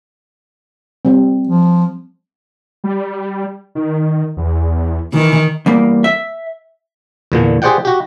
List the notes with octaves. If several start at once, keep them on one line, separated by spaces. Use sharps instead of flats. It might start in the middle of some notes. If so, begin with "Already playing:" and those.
G3 C4
F3
G3
D#3
E2
D#3 E3
E2 G3 A#3
E5
E2 A#2 D3
G4 G#4 C5 D5 F#5 G5
F#4 G4